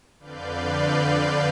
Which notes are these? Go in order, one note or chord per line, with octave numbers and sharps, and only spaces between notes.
F2 D3 B4 D5 F5 G6